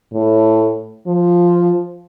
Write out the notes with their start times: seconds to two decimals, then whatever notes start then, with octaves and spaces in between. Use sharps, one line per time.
0.13 A2
1.07 F3